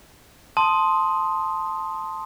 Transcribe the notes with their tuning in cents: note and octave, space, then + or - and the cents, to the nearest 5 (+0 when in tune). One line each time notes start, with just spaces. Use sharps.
A5 +0 C6 +0 D#6 +5